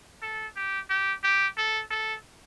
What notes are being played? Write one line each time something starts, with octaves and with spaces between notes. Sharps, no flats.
A4
G4
G4
G4
A4
A4